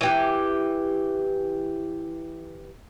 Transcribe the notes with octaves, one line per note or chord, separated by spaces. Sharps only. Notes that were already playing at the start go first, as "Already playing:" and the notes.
E3 G4